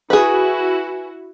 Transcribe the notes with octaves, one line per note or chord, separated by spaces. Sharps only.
E4 F#4 G#4 B4